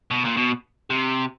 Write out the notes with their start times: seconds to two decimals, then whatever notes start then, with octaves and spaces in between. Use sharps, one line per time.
0.11 B2
0.25 A#2
0.37 B2
0.90 C3